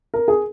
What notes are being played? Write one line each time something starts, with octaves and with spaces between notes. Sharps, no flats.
A#4
G#4